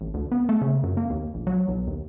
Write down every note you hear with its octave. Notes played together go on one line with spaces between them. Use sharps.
A1
D2
B3
A3
C#3
F#2
A#3
D#2
A#1
F#3
B1
D#2